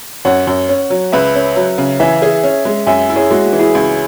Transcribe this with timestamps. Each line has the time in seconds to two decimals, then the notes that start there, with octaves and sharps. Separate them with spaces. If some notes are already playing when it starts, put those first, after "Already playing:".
0.25 F#2 C#5 F#5
0.47 F#2
0.69 C#4
0.90 F#3
1.12 C#2 B4 E5
1.35 C#4
1.56 F#3
1.78 C#3
2.00 E3 E5 G#5
2.22 G#4
2.44 C#4
2.65 G#3
2.86 F#2 E5 G#5
3.09 E4
3.16 G#4 C#5
3.30 G#3 F#4
3.45 F#4
3.53 E3
3.59 E4 G#4
3.75 C#2